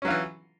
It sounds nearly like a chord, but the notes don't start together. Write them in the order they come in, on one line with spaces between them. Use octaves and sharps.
C#4 F#3 F4 E3